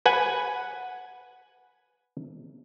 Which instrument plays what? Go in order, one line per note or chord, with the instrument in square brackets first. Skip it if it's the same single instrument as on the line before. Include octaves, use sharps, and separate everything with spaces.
[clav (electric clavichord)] B4 F#5 G#5